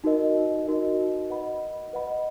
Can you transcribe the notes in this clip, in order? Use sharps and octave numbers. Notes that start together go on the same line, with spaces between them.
D#4 F#4 A#4 D#5
D#4 F#4 A#4 D#5
B4 D#5 F#5 B5
B4 D#5 F#5 B5